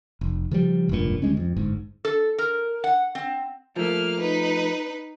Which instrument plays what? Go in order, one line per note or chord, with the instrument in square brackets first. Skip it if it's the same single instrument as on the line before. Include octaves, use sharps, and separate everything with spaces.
[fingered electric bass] F1
C#3 F3 G3
F1 C#2 G2 A#2
D2 G3 G#3 C#4
F2
G1 G#2
[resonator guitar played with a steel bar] A4
A#4
F#5
C4
[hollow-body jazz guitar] F3 A3 [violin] A#3 F6
[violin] D#4 B4